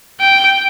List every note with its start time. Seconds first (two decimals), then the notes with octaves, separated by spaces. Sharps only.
0.21 G5